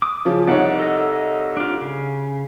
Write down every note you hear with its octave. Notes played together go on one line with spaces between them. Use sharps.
D6 D#6
C#3 F3
C2 D#4 C#5 D5 F#5
A4 D#5
D4 F4
C#3